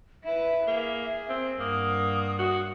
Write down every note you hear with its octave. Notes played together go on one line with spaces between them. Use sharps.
E4 B4 E5
A#3 G#4
C4
G2 A#3 F#5 D#6
F#4